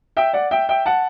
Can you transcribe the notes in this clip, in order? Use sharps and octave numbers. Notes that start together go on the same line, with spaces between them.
E5 G5
D5 F#5
E5 G5
E5 G5
F#5 A5